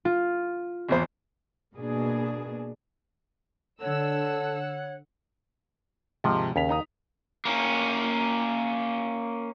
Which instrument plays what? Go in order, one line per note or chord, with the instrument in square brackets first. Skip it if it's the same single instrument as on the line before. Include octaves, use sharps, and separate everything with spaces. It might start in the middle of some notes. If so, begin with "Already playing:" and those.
[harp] F4
[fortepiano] G#1 E2 C5
[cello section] B2 A#3 D4 G#4
[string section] D3 E6 [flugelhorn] A4 [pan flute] C#5 [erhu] F#5
[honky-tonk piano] D#2 G#2 [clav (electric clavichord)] C3 F3
[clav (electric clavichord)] D#2 [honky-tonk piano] C#3 B6 F7
[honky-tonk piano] D#4 A#5 D#6
[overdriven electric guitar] A#3 C#4